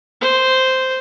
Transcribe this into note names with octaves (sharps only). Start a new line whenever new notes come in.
C5